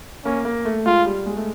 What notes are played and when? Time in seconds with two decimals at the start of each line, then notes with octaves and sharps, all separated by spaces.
0.25 A#3 C#4
0.45 A#3
0.65 A3
0.85 G#3 F4
1.05 G3
1.26 G#3
1.37 A3